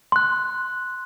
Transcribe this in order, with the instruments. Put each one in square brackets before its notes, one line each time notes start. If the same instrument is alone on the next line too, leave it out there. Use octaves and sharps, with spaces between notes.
[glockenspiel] C6 F#6